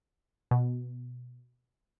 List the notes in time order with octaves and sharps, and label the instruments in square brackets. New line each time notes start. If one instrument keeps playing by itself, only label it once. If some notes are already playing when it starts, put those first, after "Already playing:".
[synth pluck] B2